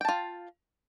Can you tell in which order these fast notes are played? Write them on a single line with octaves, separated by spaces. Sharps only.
G5 A5 F4